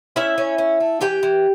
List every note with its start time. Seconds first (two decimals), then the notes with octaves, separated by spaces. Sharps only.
0.16 C#4 E4 E5
0.38 C#4
0.58 C#4
0.81 A3
1.01 E3 G4 G5
1.23 E3